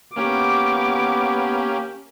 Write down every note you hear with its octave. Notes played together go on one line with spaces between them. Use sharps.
A#3 B3 C#4 G4 D6